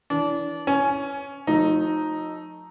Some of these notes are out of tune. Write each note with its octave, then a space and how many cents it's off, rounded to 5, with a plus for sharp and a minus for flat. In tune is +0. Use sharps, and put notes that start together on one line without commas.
E3 +0 D4 -25
C#4 +0 G#5 +20
F3 +45 A3 +0 D#4 +0